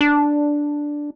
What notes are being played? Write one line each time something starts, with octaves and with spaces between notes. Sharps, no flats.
D4